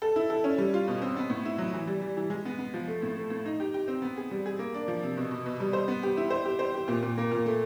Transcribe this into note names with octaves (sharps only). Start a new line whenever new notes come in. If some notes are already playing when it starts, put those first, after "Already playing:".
A4
E4
A4
C#4
G3
F4
B2
C4
B3
A2
E4
F#3
E3
G3
G3
E3
G#3
B3
B3
F3
A3
A2
A3
A2
D#4
G4
G4
C4
B3
G#4
G3
G#4
A#3
D4
F3
C3
B2
B2
B2
G3
C5
B3
G4
E4
C5
G4
C5
G4
A#2
A#2
A#3
A#2
A3